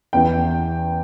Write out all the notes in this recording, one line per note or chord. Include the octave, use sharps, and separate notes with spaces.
E2 E3 G5